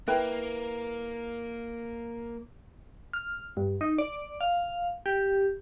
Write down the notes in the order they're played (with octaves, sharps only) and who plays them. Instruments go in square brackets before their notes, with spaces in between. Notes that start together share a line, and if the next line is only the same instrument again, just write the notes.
[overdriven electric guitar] A#3 [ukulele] E4 B4 G5
[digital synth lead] F6
G2
D#4
D5
F5
G4